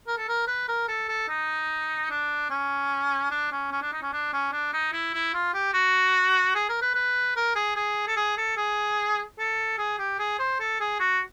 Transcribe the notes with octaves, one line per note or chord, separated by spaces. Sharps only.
A#4
A4
A#4
B4
A#4
A4
A4
D#4
D4
C#4
D4
C#4
C#4
D4
D#4
C#4
D4
C#4
D4
D#4
E4
E4
F4
G4
F#4
G#4
A#4
B4
B4
A#4
G#4
G#4
A4
G#4
A4
G#4
A4
G#4
G4
G#4
C5
A4
G#4
F#4